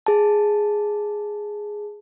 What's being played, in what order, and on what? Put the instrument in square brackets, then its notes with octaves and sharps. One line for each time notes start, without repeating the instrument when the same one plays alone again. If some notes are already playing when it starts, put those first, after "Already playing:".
[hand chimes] G#4 A5